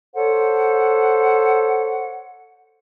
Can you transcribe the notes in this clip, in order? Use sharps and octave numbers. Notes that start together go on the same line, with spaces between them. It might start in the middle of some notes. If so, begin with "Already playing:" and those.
A4 C5 C#5 F#5